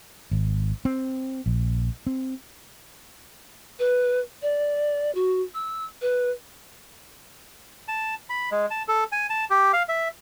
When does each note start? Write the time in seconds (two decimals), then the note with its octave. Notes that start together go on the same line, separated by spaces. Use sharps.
0.31 G#1
0.85 C4
1.46 A#1
2.07 C4
3.79 B4
4.42 D5
5.15 F#4
5.54 E6
6.02 B4
7.88 A5
8.30 B5
8.51 G#3
8.70 A5
8.88 A4
9.12 G#5
9.30 A5
9.50 G4
9.73 F5
9.89 E5